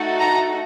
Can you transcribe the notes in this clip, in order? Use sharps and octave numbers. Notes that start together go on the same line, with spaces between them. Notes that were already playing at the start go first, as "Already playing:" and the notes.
Already playing: A3 D#4 F#4 A4
A#5